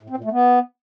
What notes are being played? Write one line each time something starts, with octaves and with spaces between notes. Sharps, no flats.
A2
C4
A#2
A3
B3